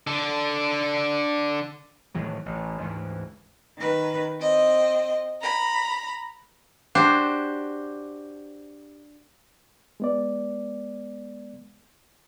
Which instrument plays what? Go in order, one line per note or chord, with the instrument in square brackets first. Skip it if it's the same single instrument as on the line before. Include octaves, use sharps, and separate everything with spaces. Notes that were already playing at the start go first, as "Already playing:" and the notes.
[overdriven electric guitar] D3 A4
[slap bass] A2 D#3 E3 F#3
A1
D2 G#2 E3
[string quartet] D#3 B4
C4 D#5
A#5 B5
[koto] D4 F#4 G4 C5
[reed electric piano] G#3 B3 D5